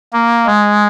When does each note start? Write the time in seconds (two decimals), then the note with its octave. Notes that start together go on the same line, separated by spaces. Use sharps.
0.13 A#3
0.46 G#3